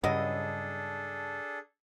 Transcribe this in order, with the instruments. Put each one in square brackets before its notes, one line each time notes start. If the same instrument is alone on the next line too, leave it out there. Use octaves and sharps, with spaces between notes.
[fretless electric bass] G2 C#3 [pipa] F#3 E4 D#5 [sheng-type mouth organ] D4 G#4 A4